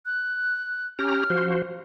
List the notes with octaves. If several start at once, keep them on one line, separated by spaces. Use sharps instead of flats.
F#6
C#4 G4 A#5 F6
F3 F#4 C5